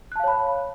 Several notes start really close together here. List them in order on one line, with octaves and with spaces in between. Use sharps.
F#6 A5 F5 C#5 B5